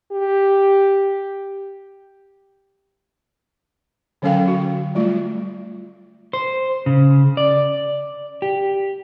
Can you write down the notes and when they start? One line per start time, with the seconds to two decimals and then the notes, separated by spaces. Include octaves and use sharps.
0.12 G4
4.22 D3 F#3 C#4 A4 F5 G5
4.48 F#4
4.95 G3 A3 F4
6.33 C5
6.86 C#3
7.37 D5
8.42 G4